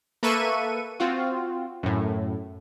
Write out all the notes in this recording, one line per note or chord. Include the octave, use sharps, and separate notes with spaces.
A#3 A4 B4 E5 C#6 D#7
C4 F4 F#4
F#2 A2